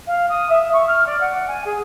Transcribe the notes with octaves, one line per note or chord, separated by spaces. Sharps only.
F5
D#6
E5
C#6
F6
D5
F#5
G#5
G#4